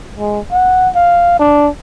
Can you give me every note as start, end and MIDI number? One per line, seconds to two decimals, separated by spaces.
0.19 0.40 56
0.52 0.89 78
0.95 1.35 77
1.39 1.69 62